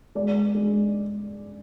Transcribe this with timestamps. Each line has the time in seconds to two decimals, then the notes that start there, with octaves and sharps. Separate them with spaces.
0.15 G#3 D5
0.55 G#3